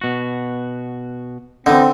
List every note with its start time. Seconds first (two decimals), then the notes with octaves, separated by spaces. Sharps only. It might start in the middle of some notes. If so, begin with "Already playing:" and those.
0.01 B2 F#4
1.66 D3 E3 C4 D#4